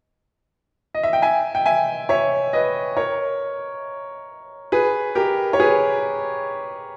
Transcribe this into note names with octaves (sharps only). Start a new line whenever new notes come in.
D#5
E5
G5
E5 G#5
G5
E5 G#5
C#5 E5
B4 D#5
A#4 C#5
G#4 B4
G4 A#4
C#5
G#4 B4